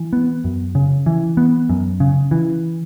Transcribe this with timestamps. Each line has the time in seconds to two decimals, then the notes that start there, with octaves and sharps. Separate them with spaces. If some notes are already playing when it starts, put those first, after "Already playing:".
Already playing: E3
0.13 B3
0.44 F#2
0.75 C#3
1.06 E3
1.37 B3
1.69 F#2
2.00 C#3
2.31 E3